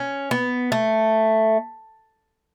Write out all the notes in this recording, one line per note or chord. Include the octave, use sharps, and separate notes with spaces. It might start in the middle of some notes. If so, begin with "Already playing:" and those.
Already playing: C#4
B3
A3